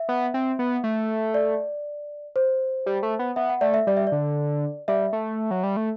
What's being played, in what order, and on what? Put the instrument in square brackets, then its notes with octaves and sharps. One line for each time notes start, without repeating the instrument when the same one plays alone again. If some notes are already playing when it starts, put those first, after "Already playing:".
Already playing: [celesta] E5
[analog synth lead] B3
C4
B3
A3
[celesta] D5
C5
[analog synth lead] G3
A3
B3
[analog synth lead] B3 [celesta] E5
[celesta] F#5
[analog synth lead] A3 [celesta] D5
[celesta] E5
[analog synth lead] G3 [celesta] D5
[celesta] E5
D5
[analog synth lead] D3
[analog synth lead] G3 [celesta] E5
[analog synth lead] A3
F#3
G3
A3